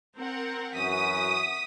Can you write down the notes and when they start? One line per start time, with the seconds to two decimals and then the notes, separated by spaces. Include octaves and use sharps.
0.18 C4 A#4 F#5
0.74 F#2 E3 F#4 D#6 B6